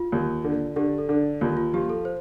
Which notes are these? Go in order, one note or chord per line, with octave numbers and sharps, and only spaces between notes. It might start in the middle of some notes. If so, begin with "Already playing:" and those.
Already playing: F4
D#2
D3
D3 G4
A4
D3
D#2 F4
F4
F3 G4
A4
C5